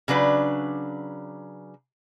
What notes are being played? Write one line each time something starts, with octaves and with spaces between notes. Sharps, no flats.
C#3 F#3 D4 B4